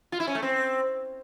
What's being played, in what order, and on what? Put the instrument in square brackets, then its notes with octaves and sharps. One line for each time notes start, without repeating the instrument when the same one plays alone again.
[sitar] F4
E4
C#4
A3
C4